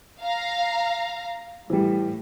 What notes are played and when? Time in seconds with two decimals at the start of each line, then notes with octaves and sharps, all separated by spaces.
0.23 F5 A#5
1.70 A2 E3 G3